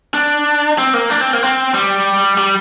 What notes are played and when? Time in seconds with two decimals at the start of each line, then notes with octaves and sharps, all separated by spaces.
0.14 D4
0.78 C4
0.94 A#3
1.10 D4
1.21 C4
1.33 A#3
1.43 C4
1.74 G3
2.38 G3